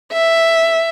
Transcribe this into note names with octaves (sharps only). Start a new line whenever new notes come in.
E5